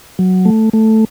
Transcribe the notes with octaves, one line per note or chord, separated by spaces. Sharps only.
F#3
A3
A3